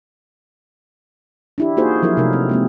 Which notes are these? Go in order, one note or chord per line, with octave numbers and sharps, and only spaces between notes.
D4 E4 G4
A#3 D#4 F4 F#4 G#4 C5
F3 F#3 E4 A#4
C3 A3 D#4 A#4
C4
G#3 A#3 C4